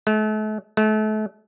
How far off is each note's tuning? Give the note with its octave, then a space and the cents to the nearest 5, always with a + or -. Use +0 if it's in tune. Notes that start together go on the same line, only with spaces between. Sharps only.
A3 -40
A3 -35